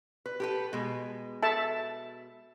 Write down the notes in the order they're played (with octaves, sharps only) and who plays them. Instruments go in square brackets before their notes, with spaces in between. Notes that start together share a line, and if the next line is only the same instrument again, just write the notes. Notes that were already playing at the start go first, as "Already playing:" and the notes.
[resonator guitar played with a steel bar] B4
G4 A4 B4
B2 G#3
[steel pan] A4 E5 A5